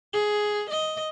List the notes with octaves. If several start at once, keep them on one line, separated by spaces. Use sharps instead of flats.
G#4
D#5